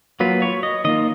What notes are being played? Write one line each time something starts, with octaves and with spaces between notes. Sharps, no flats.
F#3 A#3 F4 B4
C#5
D#5
D#3 A#3 F4 D#5